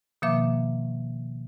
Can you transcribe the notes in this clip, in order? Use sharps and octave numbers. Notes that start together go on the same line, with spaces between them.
B2 D#3 F3 A#3 E5 D6